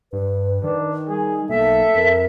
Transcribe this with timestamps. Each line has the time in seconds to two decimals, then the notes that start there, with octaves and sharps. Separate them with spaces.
0.13 G2 B4
0.63 D#3 D4
1.08 G3 G#4
1.49 B1 A#3 A4 E5
1.95 F2 A#4